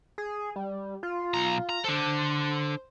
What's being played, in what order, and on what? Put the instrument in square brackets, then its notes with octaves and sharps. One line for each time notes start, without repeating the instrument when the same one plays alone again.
[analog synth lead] G#4
G3
F4
[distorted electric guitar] B1 A#5
A#5
[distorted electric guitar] D4 A4 [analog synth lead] C5